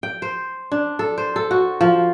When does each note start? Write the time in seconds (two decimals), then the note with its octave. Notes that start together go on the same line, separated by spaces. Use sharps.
0.03 G5
0.22 C5
0.72 D4
0.99 A4
1.18 C5
1.36 A4
1.51 F#4
1.81 F3